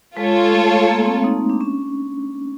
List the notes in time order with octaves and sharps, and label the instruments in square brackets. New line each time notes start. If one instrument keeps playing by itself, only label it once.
[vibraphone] G#3 [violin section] F4 A4 C#5
[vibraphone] A3
A#3
C4
D#4
D4
C#4